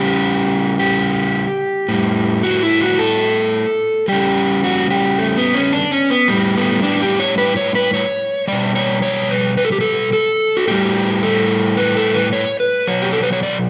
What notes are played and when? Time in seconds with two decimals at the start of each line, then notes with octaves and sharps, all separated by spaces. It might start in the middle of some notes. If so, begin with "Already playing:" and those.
Already playing: C#3 G3 G4
0.79 G4
1.89 A2 G3
2.43 F#4
2.63 E4
2.81 F#4
2.99 A4
4.08 C#3 G3 G4
4.64 F#4
4.90 G4
5.18 A3
5.37 B3
5.54 C#4
5.73 D4
5.92 C#4
6.10 B3
6.28 A2 G3
6.56 B3
6.83 D4
7.02 G4
7.20 C#5
7.38 B4
7.57 C#5
7.75 B4
7.94 C#5
8.48 B2 G3 D5
8.75 C#5
9.02 C#5
9.30 B4
9.57 B4
9.65 A4
9.72 G4
9.81 A4
10.13 A4
10.57 F#4
10.68 A2 G3 G4
11.23 A4
11.77 B4
11.96 A4
12.14 B4
12.33 C#5
12.60 B4
12.87 B2 F#3 C#5
13.02 G4
13.13 A4
13.23 B4
13.33 C#5
13.43 D5